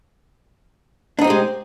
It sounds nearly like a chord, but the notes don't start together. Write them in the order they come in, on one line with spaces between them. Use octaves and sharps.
D4 D#4 C4 G4 G#3